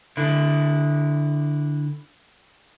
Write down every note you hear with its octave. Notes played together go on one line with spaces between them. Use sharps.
D3 E4